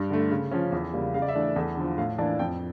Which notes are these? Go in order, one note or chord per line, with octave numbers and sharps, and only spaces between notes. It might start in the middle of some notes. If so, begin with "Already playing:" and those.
Already playing: G2
D3 A3
C#3
F3 C#4
E2
C#3 G3 A#3
C#3 F5
D5
E5
E3 A3 D4
A4
E2 A4
D3 F3
A2 F5
E3 A#3 D4 A5
F2 G5